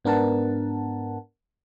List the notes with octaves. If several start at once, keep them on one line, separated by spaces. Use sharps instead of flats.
G#2 B3 D4 A#4 F#5 A5